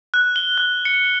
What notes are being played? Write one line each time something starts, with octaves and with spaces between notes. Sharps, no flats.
F#6
G7
F#6
C#7